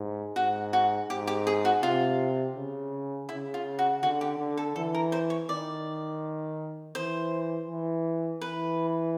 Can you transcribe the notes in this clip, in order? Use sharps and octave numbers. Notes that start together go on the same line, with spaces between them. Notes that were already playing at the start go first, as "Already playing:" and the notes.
Already playing: G#2
G#2 F#4
F#4
G#2 G4
G4
G#4
F#4
C3 F4
C#3
C#3 E4
F4
F#4
D3 F#4
G4
D3
A4
E3 A4
A#4
C5
C#5
D#3 D5
E3 C5
E3
E3 B4